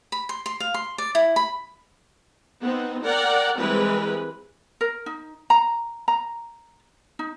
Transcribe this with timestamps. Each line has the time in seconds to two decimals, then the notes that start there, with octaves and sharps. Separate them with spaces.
0.12 B5
0.29 C6
0.46 C6
0.60 F5
0.74 C6
0.98 D5
1.15 E4
1.36 B5
2.61 B3 C4 D#4
3.02 A#4 D5 F#5 G5
3.57 E3 G3 G#3 C4 A#4 B4
4.81 A#4
5.06 D#4
5.50 A#5
6.08 A#5
7.19 D#4